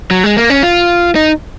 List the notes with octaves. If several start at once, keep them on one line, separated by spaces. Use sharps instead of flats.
F#3
G#3
A#3
C#4
F4
D#4